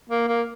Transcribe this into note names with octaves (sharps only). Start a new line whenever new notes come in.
A#3
A#3